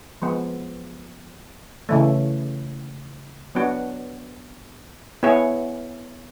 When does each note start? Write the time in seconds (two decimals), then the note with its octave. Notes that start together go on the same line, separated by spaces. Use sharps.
0.22 F3 G#3 B3
1.89 C#3 E3 A3
3.55 F#3 B3 D4 F#4
5.23 B3 E4 G#4 C#5